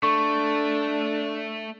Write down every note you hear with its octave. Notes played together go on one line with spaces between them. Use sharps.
A3 D4 A4 C#6